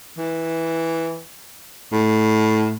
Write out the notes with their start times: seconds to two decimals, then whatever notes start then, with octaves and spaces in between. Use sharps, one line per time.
0.18 E3
1.92 A2